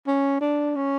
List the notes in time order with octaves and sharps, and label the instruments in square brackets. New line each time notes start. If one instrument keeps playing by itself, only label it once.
[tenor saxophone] C#4
D4
C#4